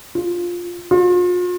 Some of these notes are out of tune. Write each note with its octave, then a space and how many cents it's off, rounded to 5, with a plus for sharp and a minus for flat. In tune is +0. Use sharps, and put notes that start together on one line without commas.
F4 +5
F4 +40